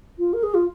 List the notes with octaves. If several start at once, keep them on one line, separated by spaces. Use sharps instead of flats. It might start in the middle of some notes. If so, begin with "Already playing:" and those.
F4
A#4
G#4
F4